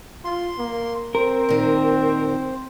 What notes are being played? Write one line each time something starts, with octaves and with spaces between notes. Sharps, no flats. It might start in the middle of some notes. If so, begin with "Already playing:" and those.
F4 C6
A#3
C4 A#4 C5
A#2 D#3